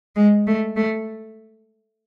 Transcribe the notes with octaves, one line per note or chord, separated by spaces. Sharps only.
G#3
A3
A3